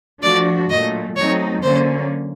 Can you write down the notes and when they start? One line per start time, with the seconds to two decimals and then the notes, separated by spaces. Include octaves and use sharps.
0.22 F3 A3 D4 F#4 D5
0.69 A#2 F#3 A3 D#5
1.16 F#3 A3 C4 D#4 C#5
1.63 D3 F#3 A#3 C#4 C5